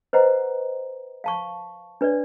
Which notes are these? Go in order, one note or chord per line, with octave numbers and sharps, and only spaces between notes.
B4 C5 D#5 F#5 A#5
F5 A5 C#6
D4 B4 C#5 D5